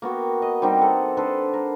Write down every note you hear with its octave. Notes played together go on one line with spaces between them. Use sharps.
A#3 B3 F#4 G5
D#5
G3 C4 D#4 G4
A4 F#5
D4 A4 B4 C5
A#4